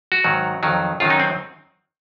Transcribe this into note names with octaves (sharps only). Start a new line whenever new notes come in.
F#4
G#2 D#3 F#3
F2 D#3 F#3
F#2 D#3 F#3 F4
D#4
C4